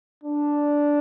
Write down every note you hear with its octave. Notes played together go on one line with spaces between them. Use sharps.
D4